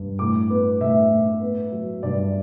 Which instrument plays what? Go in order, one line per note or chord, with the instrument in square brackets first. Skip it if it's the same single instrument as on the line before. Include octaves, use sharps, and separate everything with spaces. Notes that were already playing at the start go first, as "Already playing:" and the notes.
Already playing: [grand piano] G2
A2 D6
B3
A2 E5
A2
B3
F#3
G2 D5